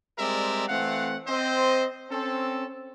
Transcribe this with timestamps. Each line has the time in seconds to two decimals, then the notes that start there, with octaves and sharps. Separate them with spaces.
0.19 G3 G#3 C4 A#4 D5 E5
0.68 E3 A3 C4 F5 F#5
1.27 C4 C5 D#5
2.10 C4 C#4 A4